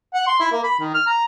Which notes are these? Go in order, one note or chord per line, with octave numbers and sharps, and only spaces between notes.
F#5
C6
E4
A#3
B5
D#3
F6
A#5